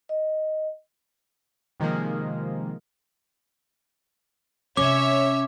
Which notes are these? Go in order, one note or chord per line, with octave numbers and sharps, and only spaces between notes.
D#5
C3 D#3 F3 G#3 A#3
C3 A3 C#4 C#5 E5 D6